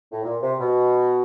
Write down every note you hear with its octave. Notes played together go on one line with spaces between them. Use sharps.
A2
A#2
C3
B2